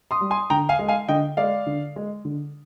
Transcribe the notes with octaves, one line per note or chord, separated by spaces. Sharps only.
C6 D#6
G3
G#5 C6
D3 G5 A#5
F5 G#5
G#3
F5 G#5
D3 D#5 G5
G#3 D5 F5
D3
G#3
D3